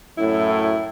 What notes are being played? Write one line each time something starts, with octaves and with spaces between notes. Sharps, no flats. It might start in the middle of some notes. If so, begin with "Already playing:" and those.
F#2 A2 E4